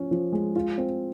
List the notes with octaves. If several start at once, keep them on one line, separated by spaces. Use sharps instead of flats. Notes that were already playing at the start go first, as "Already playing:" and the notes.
Already playing: F3 C#4
F3
G#3
F4
C4